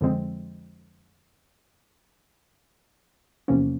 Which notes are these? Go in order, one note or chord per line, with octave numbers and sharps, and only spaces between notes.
F2 D3 F3 G#3 C4
E2 C3 F3 A#3 C#4